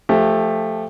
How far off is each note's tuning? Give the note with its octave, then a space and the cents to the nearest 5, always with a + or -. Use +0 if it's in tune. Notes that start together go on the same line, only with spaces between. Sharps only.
F3 +0 A3 +0 G4 +20